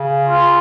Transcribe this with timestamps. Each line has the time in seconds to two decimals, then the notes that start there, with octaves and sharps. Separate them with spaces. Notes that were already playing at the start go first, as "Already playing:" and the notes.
Already playing: C#3
0.28 F4